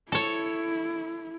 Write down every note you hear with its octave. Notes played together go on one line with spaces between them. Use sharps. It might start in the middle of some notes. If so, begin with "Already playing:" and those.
E4 A4 C#5